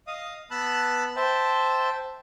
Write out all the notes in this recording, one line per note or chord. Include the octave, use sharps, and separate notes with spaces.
D#5 F5 D#6
B3 A5 B5 E6 F#6
C5 E5 G5 A5